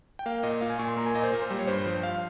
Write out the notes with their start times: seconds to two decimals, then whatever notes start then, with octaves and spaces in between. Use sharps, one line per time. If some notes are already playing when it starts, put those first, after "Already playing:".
0.19 G5
0.26 A#3 F5
0.43 A#2 D#5
0.61 A#2 F5
0.70 G#5
0.79 A#2 C#6
0.88 C6
0.97 A#3 A#5
1.06 G#5
1.14 A#2 D#5
1.24 C5
1.32 A#2 A#4
1.42 C5
1.50 G3
1.59 C#5
1.68 G2 C5
1.86 F3
2.03 F5